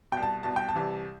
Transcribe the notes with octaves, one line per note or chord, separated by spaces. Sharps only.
C2 B2 G5
A5
C2 B2 A5
G5
A5
C2 C3 E3